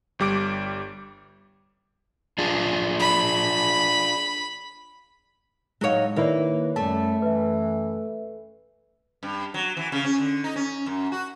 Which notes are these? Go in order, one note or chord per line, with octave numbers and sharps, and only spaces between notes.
G1 G3 D6 D7
D4 F4 G#4
B5
A2 F#3 G#3 D#4 C#5 F5
D#3 A#3 E4 B4 C#5 D5
F#2 G3 A3 A5
F#2 E3 B4 E5
G2
F#3
E3
C#3
C#4
D3
D#4
C#4
F#2
F#4